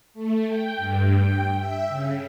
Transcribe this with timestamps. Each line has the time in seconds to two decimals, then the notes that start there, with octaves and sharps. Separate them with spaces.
0.14 A3
0.47 G5
0.77 G2
1.16 G5
1.57 E5
1.89 C#3